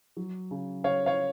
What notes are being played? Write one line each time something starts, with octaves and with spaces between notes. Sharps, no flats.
F#3
C#3
C#3 C#5 F5
C#5 F5